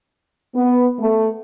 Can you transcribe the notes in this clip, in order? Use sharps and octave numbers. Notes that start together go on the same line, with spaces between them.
B3
A3